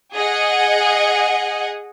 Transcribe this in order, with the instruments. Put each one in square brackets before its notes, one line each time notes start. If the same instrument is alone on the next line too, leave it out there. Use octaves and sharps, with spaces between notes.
[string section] G#4 D#5 F#5